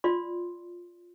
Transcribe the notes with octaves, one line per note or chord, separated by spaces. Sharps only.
F4 D5 C6